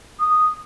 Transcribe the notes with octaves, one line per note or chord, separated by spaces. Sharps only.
D#6